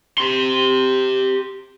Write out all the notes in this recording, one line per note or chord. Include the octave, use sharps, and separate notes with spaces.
G4 C6